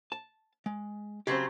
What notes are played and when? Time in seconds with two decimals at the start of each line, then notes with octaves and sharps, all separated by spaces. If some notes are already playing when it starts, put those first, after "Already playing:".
0.12 A5
0.66 G#3
1.27 C#3 F#3 C4 G4 C5